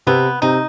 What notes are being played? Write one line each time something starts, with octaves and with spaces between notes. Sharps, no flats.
C3 B3 C4
C3 C4 D#4